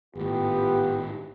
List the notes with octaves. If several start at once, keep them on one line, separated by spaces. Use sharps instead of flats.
G#1 A2 B3 F4 G4